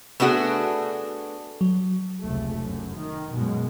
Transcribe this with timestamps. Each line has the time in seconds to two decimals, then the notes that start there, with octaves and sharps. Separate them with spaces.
0.20 A3 B3 D4 F#4 G#4
1.61 F#3
2.21 F1 C#2 A3
2.61 F#2
2.97 D#3
3.33 F#2 B2 G#3